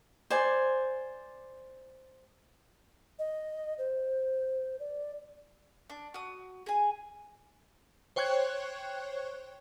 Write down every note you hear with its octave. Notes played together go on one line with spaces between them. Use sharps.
C5 D5 G#5
D#5
C5
D5
D4
F#4 D#6
G#4 G#5
C5 C#5 G5 C#6 F#6 G#6